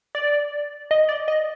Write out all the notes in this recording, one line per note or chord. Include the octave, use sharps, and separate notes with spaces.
D5
D#5
D5
D#5